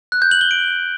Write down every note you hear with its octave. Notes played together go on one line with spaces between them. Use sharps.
F#6
G6
F#7
G7
D7